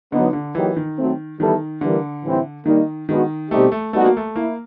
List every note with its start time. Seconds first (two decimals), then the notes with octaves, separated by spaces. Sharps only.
0.12 D3 F#3 B3 D#4
0.33 D3
0.55 E3 F#3 A#3 D#4 G4
0.76 D#3
0.97 F#3 A3 C4
1.39 D#3 E3 G3 B3 E4 A4
1.81 D3 E3 G3 A#3
2.23 A2 E3 G3 C4 E4
2.66 D#3 G3 A#3 D#4
3.09 D#3 G#3 B3 D4 F#4
3.51 B2 G3 A3 C4 D#4 G4
3.72 A3
3.93 G3 A3 B3 D#4 F#4
4.05 A#3
4.17 A3
4.35 A#3 E4